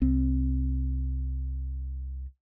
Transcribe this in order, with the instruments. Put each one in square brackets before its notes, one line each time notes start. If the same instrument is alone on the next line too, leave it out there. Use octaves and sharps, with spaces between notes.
[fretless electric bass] C2 C4